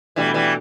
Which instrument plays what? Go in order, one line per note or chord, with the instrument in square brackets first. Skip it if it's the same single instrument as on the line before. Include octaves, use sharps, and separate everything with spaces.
[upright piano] B2 A3 D4 F#4 [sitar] E3 G3
[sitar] E3 G3